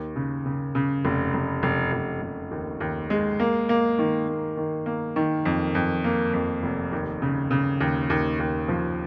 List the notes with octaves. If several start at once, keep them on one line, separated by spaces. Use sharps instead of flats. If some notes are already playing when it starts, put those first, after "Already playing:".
Already playing: D#2
C#3
C#3
C#3
F1
F1
F1
F1
F1
D#2
D#2
G#3
A#3
A#3
D#3
A#3
D#3
A#3
D#3
F2
F2
A#3
F2
F1
D#2
C#3
C#3
D#2
D#2
D#2
F3